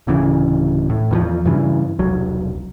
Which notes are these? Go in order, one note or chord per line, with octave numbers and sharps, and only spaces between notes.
D1 D2 C#3 E3
A2
E2 D#3 F3
G2 C#3 E3
E1 C2 F#3